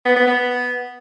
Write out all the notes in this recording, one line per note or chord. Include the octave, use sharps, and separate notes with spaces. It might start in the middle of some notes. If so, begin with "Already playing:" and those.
B3
B3
B3